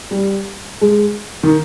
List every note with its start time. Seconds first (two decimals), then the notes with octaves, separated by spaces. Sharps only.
0.11 G3
0.81 G#3
1.43 D#3